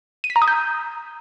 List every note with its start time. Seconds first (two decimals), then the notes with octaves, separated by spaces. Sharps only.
0.24 D#7
0.30 B6
0.36 A#5
0.42 D#6
0.48 G6